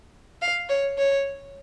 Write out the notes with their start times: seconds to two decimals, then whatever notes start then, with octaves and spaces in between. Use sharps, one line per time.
0.42 F5
0.69 C#5
0.98 C#5